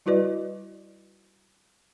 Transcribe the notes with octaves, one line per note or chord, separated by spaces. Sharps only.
G3 E4 F#4 B4 D5 D#5